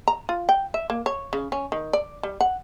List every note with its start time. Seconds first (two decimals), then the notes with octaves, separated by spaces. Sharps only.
0.08 A#5
0.29 F4
0.49 G5
0.74 E5
0.90 A#3
1.06 C#5
1.33 C#3
1.52 C#4
1.72 D#3
1.93 D5
2.23 G3
2.41 F#5